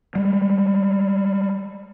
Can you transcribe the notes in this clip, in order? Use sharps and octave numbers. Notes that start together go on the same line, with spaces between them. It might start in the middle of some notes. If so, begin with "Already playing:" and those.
G3 G#3